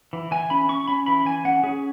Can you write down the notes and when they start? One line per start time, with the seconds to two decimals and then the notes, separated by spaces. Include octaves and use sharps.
0.13 E3
0.31 E3 G#5
0.50 C#4 B5
0.69 C#4 C#6
0.88 C#4 B5
1.06 E3 B5
1.25 E3 G#5
1.45 C#4 F#5
1.63 C#4 G#4